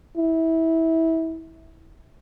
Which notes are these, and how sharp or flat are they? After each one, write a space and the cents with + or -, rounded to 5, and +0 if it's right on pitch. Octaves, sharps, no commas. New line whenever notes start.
E4 -20